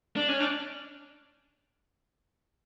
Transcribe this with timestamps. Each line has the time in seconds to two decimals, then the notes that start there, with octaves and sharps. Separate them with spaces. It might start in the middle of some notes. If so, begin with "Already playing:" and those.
0.16 D4
0.29 C#4
0.40 D4